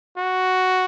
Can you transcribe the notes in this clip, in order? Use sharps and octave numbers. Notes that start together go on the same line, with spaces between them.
F#4